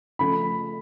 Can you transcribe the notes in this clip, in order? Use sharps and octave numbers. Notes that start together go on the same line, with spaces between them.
C#3 F3 A3 B5